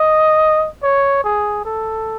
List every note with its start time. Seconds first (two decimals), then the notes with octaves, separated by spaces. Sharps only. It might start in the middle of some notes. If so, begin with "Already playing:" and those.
Already playing: D#5
0.83 C#5
1.24 G#4
1.65 A4